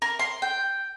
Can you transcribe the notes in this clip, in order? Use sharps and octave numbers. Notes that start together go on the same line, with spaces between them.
A#4
C6
G5